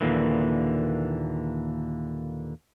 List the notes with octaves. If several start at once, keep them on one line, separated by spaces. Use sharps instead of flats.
D#2 A#2 D3 E3